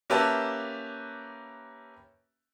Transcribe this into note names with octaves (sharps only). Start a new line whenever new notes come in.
A#3 C#4 G4 B4 E5 A5